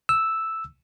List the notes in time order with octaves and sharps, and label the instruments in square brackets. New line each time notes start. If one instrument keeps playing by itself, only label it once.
[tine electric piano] E6